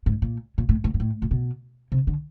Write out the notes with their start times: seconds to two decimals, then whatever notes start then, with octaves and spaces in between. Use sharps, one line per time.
0.06 G#2
0.22 A#2
0.58 A#2
0.69 A2
0.84 A2
0.94 G#2
1.00 A2
1.22 A#2
1.31 B2
1.92 C3
2.07 D3